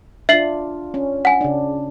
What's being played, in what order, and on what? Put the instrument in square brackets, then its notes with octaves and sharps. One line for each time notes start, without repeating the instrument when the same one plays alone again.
[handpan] D4 F4 [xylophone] E5 C7 F#7
[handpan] C#4
[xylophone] F#5 G#5
[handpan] C#3 D4